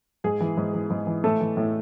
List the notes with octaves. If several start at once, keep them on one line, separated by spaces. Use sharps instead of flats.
G#2 G#4
E3
G#2
E3
G#2
E3
A2 A3 A4
E3
A2